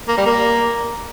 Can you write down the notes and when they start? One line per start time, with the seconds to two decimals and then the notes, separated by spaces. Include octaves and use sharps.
0.08 A#3
0.17 G3
0.26 A#3